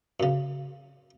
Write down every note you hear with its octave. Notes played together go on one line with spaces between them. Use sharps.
F#2 C#3